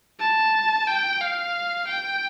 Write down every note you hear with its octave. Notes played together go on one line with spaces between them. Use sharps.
A5
G5
F5
G5